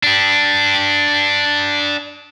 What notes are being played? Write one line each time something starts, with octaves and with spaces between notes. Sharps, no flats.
D4 G4